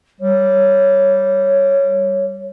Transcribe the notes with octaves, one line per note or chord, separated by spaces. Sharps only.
G3 C#5